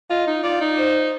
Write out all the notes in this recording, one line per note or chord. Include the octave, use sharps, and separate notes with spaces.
F4 D#5
D#4
F4 D5
D#4
C5